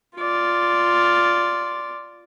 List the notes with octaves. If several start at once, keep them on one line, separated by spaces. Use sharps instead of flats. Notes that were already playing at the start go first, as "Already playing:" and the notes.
F4 D5